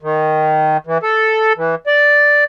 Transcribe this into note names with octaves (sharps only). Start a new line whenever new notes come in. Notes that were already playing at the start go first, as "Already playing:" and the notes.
D#3
E3
A4
E3
D5